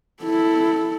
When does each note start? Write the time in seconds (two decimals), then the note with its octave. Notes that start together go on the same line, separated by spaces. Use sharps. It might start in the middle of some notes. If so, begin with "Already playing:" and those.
0.23 E4 A4